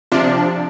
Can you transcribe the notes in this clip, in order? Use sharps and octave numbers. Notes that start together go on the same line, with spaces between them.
C3 F3 D4